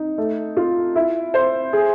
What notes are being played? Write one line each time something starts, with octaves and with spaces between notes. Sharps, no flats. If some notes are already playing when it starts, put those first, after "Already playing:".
Already playing: D#4
A3
F4
E4
C5
G#4